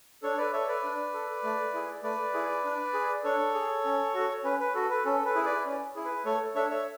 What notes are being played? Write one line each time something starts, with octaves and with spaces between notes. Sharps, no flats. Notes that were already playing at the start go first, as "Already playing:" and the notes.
D4 A4 C#5
B4 D5
A4 C#5 E5
B4 D5
D4
A4
A3
E4 G#4
A3 B4 D5
E4 G#4
D4
G#4
D4 A4 C#5
G#4
C#4
F#4 A4
C#4 B4
B4
F#4 A4
B4
C#4 A4
B4
E4 G#4
B4 D5
C#4
E4 G#4
B4
A3 A4 C#5
D4 A4 C#5 E5
C#5 E5